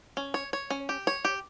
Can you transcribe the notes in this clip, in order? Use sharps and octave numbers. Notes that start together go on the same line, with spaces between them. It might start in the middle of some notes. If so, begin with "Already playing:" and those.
C#4
C#5
C#5
C#4
G4
C#5
G4